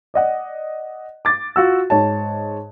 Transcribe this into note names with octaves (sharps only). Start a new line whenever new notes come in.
D5 D#5 F#5
D6 A6
F4 F#4 E6
G#2 C#5 A5